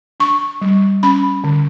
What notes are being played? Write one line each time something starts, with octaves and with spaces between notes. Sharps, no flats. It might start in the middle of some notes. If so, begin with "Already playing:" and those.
D4 C#6
G3
C#4 B5
D3